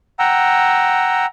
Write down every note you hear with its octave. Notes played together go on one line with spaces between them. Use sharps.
F#5 G5 A#5 E6